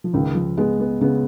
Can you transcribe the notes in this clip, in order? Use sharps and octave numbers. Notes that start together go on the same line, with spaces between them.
F3
C#2 D#3
F3
G#3 B3
B3
C#3 B3